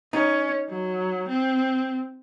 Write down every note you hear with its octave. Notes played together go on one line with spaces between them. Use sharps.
C#4 D#4
F#3
C4